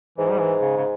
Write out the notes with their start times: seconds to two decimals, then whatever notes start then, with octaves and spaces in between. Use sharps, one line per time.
0.18 G#2 E3
0.31 G3
0.40 E3
0.61 C#3
0.77 C#3